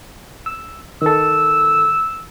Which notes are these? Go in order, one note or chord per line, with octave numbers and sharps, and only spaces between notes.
E6
D#3 A4 E6